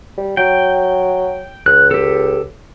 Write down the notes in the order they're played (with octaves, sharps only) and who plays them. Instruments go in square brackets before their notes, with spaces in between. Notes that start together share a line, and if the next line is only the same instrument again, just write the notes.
[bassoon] G3
[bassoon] F#3 [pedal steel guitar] G5
[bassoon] C#2 [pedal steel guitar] F#6
[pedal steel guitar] G4 A4